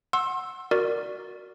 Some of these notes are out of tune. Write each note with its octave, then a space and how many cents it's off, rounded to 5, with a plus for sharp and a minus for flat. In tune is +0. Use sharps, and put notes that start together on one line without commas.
F#5 +0 C6 +35 E6 +0
F#4 +0 A#4 +0 D5 +0